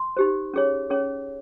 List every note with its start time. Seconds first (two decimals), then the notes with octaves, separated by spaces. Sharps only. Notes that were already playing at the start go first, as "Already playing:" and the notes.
Already playing: C6
0.17 D#4 G4 C5
0.54 C#4 G#4 C#5
0.90 C#4 G#4 C#5